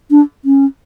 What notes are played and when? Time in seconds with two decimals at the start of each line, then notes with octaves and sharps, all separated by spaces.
0.11 D4
0.45 C#4